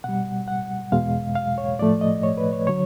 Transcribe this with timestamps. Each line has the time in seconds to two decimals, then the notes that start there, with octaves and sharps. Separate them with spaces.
0.04 B2 G3 F#5
0.48 F#5
0.92 E2 B2 G#3 F5
1.35 F5
1.58 C#5
1.79 A2 F3 A3 D5
2.01 D#5
2.23 C#5
2.38 B4
2.53 C#5
2.67 D3 F#3 C#5